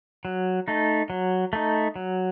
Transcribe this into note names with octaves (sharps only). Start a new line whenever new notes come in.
F#3
A3 D#4
F#3
A3 D#4
F#3